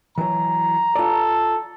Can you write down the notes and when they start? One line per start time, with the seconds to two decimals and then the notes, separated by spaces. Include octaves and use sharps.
0.18 E3 F#3 A#5
0.95 F4 A4 D5